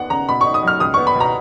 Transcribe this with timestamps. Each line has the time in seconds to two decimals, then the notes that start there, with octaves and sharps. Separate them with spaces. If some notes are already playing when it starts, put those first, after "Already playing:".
Already playing: D#2 B3 F#5
0.10 C#3 A#5
0.29 B2 B5
0.41 C#6
0.46 D#4
0.54 D#6
0.63 F#3 F6
0.80 C#2 D#6
0.94 B3 C#6
1.07 B5
1.15 B2
1.20 A#5